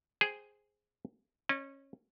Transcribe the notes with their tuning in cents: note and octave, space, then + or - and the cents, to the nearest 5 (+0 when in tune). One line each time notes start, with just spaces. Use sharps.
G#4 +0 C5 +0 G5 +0
C#4 -20 D#5 -45